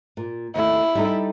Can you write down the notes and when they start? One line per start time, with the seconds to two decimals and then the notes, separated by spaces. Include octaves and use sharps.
0.17 A#2
0.55 D#2 A3 E4
0.95 G3 D#4 A4